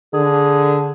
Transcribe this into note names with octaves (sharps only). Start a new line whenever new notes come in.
D3 G#4